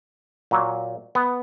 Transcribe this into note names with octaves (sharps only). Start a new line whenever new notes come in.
A#2 F#3
B3